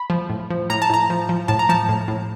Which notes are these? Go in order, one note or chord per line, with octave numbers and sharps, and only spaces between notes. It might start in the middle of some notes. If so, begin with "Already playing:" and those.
Already playing: B5
F3
A2
F3
A2 A#5
A5
A2 A#5
F3
F3
A2 A5
A#5
F3 A5
A2
A2